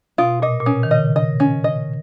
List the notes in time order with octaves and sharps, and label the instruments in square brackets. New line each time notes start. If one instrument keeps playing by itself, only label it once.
[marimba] B2 [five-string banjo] F4
[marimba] A#2 [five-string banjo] D#5
[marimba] A#2
[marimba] B2 [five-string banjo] C#4
[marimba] D#3
[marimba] C#3 [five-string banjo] D#5
[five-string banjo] D#5
C#4
D#5